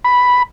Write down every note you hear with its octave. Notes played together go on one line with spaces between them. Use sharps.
B5